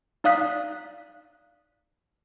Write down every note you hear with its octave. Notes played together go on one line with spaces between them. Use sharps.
D#4 D5 F5 D#6 F#6 B6